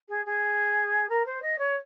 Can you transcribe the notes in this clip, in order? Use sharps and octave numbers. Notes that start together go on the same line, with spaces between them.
G#4
G#4
A#4
C5
D#5
C#5